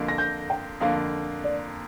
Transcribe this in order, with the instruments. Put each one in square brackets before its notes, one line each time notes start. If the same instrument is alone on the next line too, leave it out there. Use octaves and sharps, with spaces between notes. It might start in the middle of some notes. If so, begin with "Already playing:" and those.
Already playing: [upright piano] F2 D3 A#3
[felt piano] A#6
G6
G5
[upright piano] F2 D3 A#3 [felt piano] F5
[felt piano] D5